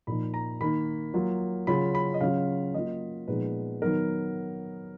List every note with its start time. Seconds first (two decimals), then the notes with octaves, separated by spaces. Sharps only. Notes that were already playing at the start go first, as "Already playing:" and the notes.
0.07 A#2 F3 A#3 D#4 B5
0.34 A#5
0.61 D#3 A#3 D#4 B5
1.14 F#3 A#3 F4
1.67 C#3 F#3 C#4 F4 B5
1.95 B5
2.14 D#5
2.21 C#3 F#3 C#4 F4 F5
2.74 F#3 A#3 F4 D#5
3.28 A#2 F3 G#3 B3 D#4 B4
3.82 D#3 F#3 B3 D#4 A#4